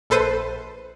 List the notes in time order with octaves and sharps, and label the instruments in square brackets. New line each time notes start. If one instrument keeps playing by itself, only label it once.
[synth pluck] A#1 A4 B4 C5 C7 D#7